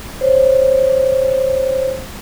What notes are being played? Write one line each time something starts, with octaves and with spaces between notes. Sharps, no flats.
C5 C#5